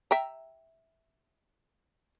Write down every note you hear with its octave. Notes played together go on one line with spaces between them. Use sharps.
E5 G5 A#5